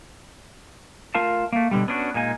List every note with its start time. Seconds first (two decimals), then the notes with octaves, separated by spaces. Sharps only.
1.15 A3 F4 A#4 F5 A5
1.52 A3 A#3
1.71 B2 D3 G3
1.88 B3 C#4 D4 E4 F#4
2.14 A#2 G#3 A#3 D#4 G#5